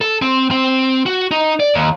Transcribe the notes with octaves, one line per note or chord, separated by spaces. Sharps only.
A4
C4
C4
F#4
D#4
D5
D#2